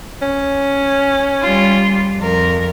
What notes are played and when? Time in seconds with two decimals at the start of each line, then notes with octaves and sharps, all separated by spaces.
0.22 C#4
1.43 G3 F4
2.17 F2 A#4